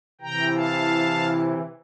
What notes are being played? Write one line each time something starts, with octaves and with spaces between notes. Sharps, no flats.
C3 E3 G5 A#5
F5 A5